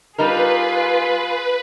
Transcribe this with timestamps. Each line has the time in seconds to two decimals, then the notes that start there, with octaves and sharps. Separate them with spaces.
0.18 G3 D#4 F4 G#4 A#4 B4